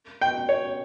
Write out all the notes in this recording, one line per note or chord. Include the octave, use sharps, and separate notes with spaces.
G5
C#5